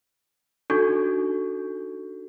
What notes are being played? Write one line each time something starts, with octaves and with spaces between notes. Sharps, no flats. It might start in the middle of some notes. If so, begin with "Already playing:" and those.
D4 D#4 F#4 A4 C#6 G6